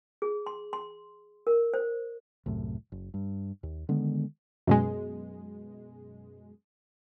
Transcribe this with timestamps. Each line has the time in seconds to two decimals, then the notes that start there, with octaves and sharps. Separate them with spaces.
0.22 G#4
0.46 C6
0.73 C6
1.47 A#4
1.74 C5
2.46 C2 F#2 A2
2.92 F#1
3.14 G2
3.63 D#2
3.89 D3 D#3 G#3 B3
4.67 F#2 B2 G#3